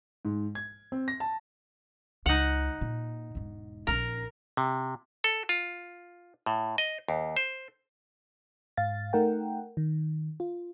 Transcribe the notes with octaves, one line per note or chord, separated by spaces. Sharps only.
G#2
G#6
C4
A#6
A5
C#2 D#4 F#5
A#2
E1 G#2
A#1 C#4 A#4
C3
A4
F4
A2
D#5
D#2
C5
G#2 F5 A6
A3 D#4 A#4 F#5 G5
D#3
F4